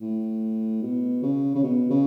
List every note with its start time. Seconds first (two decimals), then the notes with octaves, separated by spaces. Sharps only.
0.01 A2
0.83 B2
1.23 C#3
1.55 C#3
1.63 B2
1.90 C#3